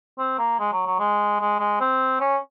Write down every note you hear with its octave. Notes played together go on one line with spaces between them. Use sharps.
C4
A#3
G#3
F#3
F#3
G#3
G#3
G#3
C4
C#4